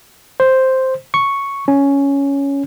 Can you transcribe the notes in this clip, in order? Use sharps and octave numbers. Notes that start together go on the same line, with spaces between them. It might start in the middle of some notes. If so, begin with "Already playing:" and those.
C5
C#6
C#4